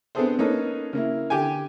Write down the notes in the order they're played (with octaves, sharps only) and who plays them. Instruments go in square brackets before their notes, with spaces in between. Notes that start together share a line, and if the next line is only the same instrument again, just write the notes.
[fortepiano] B3 C4 D4 G#4 A4 C5
A#3 C#4 D#4 A4 B4
C#3 A#3 E4
D3 G4 G5 G#5